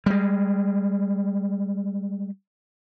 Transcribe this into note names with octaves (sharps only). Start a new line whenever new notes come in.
G3 G#3